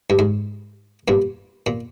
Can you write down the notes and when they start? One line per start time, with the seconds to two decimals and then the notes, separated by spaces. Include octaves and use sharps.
0.10 G2
0.19 G#2
1.08 G2 A#2
1.66 A#2